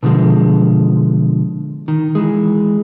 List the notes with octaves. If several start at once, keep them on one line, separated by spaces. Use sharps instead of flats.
B2 D3 F3 G#3
D#3
E3 G#3